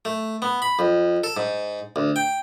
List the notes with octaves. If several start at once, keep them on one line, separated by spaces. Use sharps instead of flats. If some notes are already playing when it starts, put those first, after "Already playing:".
A3
B3
B5
F2
A4
G#2
D2
G5